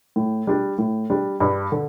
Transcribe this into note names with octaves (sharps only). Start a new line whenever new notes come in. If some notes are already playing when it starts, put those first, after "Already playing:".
A2
G3 D4
A2
G3 D4
G2
D3